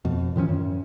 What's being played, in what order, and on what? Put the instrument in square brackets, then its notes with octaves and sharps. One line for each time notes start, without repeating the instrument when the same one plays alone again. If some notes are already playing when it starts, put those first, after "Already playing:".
[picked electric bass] F2 B2
A2 D#3 F3 C#4
F#2